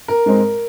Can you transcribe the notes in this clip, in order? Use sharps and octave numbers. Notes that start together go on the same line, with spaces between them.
A#4
G#2 G#3 C4